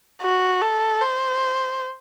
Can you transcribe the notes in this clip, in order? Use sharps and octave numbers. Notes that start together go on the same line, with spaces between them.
F#4
A4
C5